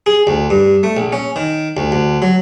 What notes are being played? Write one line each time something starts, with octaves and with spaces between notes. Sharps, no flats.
G#4
D2
G2
A3
A#1
C#4
D#3
D2
D2
F#3